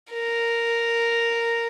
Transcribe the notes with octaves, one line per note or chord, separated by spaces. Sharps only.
A#4